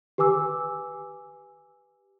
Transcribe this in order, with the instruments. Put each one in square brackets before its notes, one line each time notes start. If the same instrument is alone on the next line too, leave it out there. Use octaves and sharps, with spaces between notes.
[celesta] G4 B4 G#5 D6 E6